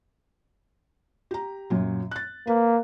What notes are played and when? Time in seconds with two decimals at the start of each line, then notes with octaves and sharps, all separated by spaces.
1.31 G4 A#5
1.70 F#2 A#2 F#3
2.11 F#6 A6
2.47 A#3 B4